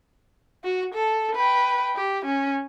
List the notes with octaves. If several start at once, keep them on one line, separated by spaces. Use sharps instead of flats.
F#4
A4
B4 G5
G4
C#4